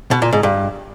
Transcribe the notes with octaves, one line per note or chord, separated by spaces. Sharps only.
B2
A#2
G#2
G2